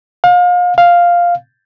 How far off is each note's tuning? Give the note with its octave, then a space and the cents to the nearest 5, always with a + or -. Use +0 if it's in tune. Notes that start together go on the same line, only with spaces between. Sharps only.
F5 +35
F5 +0